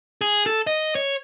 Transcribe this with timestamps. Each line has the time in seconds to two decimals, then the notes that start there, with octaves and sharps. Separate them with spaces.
0.21 G#4
0.46 A4
0.67 D#5
0.95 C#5